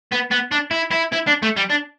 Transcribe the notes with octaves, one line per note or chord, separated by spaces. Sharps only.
B3
B3
D4
E4
E4
E4
D4
A3
G3
D4